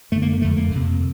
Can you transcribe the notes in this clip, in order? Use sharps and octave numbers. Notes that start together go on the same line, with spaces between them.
F#2 D3 A3
A#3
A#3
F2 D3 A3
A#3
F2 C3